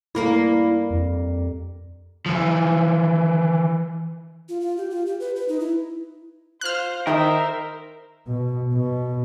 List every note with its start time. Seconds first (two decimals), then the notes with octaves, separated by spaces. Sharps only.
0.15 G2 A#3 E4 A#4
0.90 F2
2.26 E3 F3
4.49 F4
4.61 F4
4.78 G4
4.91 F4
5.06 G4
5.20 B4
5.36 B4
5.49 D#4
5.60 E4
6.61 F4 C5 F6 F#6
7.07 D#3 E4 A#4 C5 D#5 E5 D#6
8.27 B2
8.73 B2